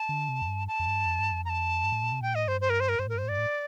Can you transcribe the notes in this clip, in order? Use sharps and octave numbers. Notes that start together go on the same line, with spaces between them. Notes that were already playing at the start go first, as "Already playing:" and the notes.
Already playing: A5
D3
C3
F2
G2
A5
F2
G2
F2
G2
F2
A#5
A5
G2
A2
A#2
C3
A#2 G5
A2 D#5
G2 C5
C5
A#4
C5
A#4
G2 C5
A2 A#4
G2
C5
A2
G2 D5
A2